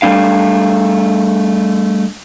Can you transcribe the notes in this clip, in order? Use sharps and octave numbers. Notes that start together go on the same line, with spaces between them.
G3 A3 D4 F5